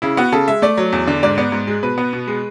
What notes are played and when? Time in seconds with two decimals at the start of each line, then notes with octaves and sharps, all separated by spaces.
0.02 C#3 E4
0.17 B3 F#4
0.32 C#3 A4
0.48 G#3 E5
0.62 A3 D5
0.78 F#3
0.93 E2
1.07 D3
1.23 G#2 D5
1.38 B3 D5
1.52 G#2
1.67 G#3
1.83 B2 B4
1.98 B3
2.13 B2
2.28 G#3